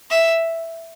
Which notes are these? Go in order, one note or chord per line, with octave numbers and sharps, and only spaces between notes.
E5